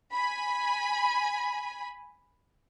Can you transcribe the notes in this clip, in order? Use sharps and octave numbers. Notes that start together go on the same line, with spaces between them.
G#5 B5